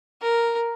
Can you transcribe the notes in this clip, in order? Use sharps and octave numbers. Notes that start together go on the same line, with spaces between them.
A#4